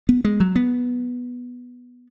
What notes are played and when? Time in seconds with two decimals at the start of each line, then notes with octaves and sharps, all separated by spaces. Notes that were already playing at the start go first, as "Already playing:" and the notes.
0.09 B3
0.25 G#3
0.40 F#3
0.56 B3